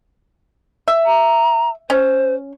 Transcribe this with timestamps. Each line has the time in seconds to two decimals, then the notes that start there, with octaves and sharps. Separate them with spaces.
0.88 E5
1.06 A#5
1.90 C#4 C5